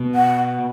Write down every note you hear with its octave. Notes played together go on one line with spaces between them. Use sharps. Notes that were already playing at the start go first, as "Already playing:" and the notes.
Already playing: B2 B3
F#5